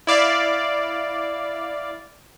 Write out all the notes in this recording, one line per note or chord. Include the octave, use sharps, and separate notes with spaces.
E4 D5 F5